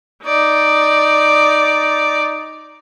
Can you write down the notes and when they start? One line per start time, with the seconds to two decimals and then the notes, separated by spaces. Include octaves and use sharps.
0.24 D#4 D5